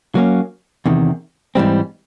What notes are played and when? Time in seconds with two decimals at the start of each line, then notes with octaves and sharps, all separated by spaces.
0.15 F#3 A#3 C#4
0.86 E2 C3 D#3
1.55 G#2 E3 G3 C4